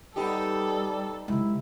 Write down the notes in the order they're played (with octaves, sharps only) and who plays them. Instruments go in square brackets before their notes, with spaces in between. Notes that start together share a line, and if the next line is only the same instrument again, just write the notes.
[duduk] G3 [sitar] B3 D#4 G4 [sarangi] A4
[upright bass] C#3 G#3 [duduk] E4